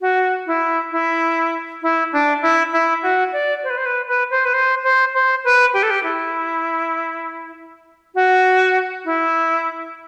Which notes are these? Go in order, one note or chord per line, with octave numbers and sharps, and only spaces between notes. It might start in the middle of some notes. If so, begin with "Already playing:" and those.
F#4
E4
E4
E4
D4
E4
E4
F#4
D5
C5
B4
C5
B4
B4
C5
B4
C5
C5
C5
B4
G4
A4
G4
E4
F#4
E4